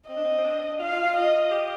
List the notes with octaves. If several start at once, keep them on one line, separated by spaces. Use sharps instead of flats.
C4 D#5
D4
C4
C4
D4
F4 F5
F4
F4
D#5
G4